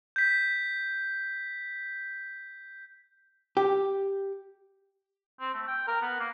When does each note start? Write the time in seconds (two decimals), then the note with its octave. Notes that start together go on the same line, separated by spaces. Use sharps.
0.16 G6 B6
3.57 G4
5.40 C4
5.54 A3
5.67 G5
5.88 A#4
6.01 B3
6.20 A#3